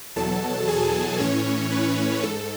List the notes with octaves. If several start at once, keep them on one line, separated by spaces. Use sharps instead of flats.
E2 B2 F#3 A4 A5
G#4 G#5
A2 E3 C#4 C#5
B4
G#2 A4